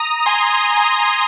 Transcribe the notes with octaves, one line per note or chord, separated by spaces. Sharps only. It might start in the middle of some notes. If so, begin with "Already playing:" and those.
Already playing: A#5 D#6
G#5 C6